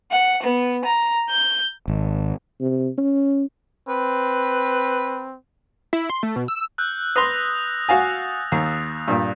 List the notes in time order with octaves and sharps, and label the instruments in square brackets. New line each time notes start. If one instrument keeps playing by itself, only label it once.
[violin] F#5
B3
A#5
G6
[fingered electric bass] G#1
[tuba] C3
C#4
[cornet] C4 [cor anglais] B4
[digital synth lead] E4
C6
A3
B2
E6
[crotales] E6 F#6 G6
[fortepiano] B4 C6 [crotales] D#6 A#6 F7
[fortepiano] F#4 F5 G#5 [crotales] A6
[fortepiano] D#2
G2 A#2